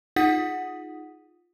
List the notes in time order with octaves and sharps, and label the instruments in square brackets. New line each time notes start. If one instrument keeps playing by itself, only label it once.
[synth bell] D#4 F4 G#4 F#5 D#6 B6